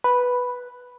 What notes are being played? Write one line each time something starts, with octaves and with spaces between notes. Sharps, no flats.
B4